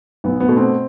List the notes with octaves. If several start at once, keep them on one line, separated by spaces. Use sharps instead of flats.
B1 B3
B3
B2 A3
C4